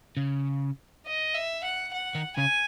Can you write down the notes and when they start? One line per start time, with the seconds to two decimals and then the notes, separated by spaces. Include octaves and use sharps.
0.17 C#3
1.06 D#5
1.34 E5
1.64 F#5
1.94 F#5
2.15 D#3
2.37 C#3 G#5